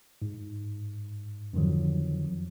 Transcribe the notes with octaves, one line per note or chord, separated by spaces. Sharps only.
G#2
F2 D3 D#3 F3 F#3